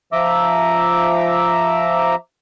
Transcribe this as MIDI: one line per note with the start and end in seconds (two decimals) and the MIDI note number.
0.13 2.15 53
0.13 2.15 76
0.13 2.15 82
0.13 2.15 86
0.13 2.15 88